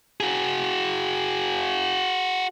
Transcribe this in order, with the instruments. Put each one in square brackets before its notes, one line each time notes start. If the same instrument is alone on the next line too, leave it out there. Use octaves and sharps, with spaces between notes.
[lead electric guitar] F#4 G#4